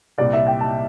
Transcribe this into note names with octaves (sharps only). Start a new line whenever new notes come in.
C2 A#2 G3 D5
E5
G5
A5